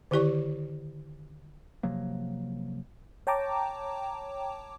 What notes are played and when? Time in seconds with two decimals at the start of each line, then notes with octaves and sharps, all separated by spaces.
0.11 D3 D#3 E4 G4 D5 C#6
1.83 C3 F3 F#3 A#3
3.27 C#5 G5 A5 A#5 D6